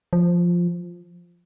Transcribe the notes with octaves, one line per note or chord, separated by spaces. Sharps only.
F3